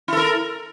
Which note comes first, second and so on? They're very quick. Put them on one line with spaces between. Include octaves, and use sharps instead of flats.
E4 A4 A#4